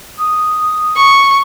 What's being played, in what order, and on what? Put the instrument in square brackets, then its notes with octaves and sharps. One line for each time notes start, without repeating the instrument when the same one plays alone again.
[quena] D#6
[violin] C#6